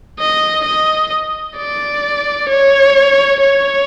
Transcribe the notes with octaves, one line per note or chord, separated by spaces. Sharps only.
D#5
D#5
D5
C#5
C#5